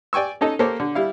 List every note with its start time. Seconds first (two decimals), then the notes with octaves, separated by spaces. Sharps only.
0.13 D5 G5 G#5 C#6 E6
0.41 C#4 D#4 A4 D#5
0.59 A#3 G4 A4 C5 C#5
0.80 D3
0.95 G3 E4 F5